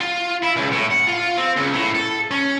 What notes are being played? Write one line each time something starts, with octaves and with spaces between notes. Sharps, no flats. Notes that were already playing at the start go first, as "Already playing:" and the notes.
F4
E4
C#2
A2
F#5
F4
C4
C#2
A2
A4
C#4